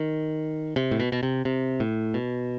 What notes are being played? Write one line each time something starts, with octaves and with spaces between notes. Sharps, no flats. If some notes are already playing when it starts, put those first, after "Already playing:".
Already playing: D#3
C3
A2
B2
B2
C3
C3
A2
B2